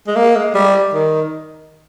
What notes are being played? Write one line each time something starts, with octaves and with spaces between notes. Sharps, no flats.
G#3
A#3
G#3
G3
D#3